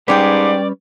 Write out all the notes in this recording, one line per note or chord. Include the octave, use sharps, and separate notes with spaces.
G#2 G3 C#4 G4 B4 C#5 D5 G5